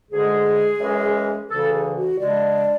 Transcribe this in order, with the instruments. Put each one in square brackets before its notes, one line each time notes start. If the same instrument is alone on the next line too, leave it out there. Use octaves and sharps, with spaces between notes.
[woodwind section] D2 D3 G#3 G#4
F#2 E3 G#3 C#4
D2 C#3 E3 A4
G#4
F#4
C#3 G#3 D4 D5